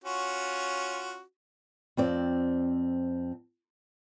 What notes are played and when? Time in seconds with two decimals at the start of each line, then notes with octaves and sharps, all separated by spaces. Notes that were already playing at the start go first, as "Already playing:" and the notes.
0.04 C#4 F4 F#4
1.97 F2 C4 D5